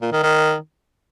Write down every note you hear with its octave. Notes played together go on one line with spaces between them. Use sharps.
A#2
D#3
D#3